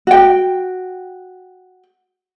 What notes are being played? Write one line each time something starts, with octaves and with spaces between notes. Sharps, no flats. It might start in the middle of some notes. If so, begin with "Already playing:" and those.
F#4 G5